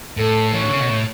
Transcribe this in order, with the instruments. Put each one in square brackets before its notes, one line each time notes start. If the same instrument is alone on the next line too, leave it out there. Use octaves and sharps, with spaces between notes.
[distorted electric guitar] A2 [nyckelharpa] A4
[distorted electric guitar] E3 [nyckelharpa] C#5
[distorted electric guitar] D3
C#3
B2
A2